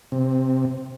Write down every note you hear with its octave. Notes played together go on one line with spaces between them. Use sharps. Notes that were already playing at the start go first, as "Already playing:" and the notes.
C3